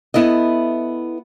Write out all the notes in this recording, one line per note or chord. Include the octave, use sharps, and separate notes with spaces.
B3 E4 A4 D#5